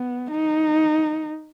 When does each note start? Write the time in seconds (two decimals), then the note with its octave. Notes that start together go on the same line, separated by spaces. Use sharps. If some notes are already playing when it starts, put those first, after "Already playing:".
Already playing: B3
0.31 D#4